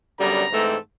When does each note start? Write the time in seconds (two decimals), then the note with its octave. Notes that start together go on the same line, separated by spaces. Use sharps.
0.19 F#2 D3 G3 B3 A#5
0.51 G#2 E3 A3 C4